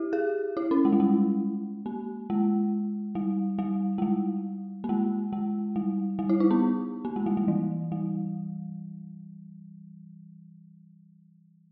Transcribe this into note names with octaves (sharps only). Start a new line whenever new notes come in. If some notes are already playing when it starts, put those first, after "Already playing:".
Already playing: E4 G4
G#4
E4
C#4
G#3
G3
G#3
A#3
G#3
G3
G3
G#3
G3
A#3
G#3
G#3
G3
G3
E4
D#4
B3
A#3
G#3
G3
G3
E3
G3